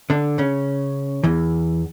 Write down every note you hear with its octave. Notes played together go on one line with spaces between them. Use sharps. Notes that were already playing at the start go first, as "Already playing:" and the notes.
D3 D4
C#3 C#4
E2 E3